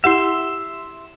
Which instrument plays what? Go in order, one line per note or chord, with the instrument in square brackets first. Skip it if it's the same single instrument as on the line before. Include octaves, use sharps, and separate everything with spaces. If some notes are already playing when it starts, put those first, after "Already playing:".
[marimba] E4 G4 F#5 [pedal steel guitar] E5 C6